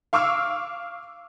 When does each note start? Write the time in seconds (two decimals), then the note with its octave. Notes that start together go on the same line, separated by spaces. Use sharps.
0.13 F5 C#6 D6 E6 F6